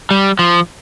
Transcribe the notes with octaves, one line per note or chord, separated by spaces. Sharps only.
G3
F3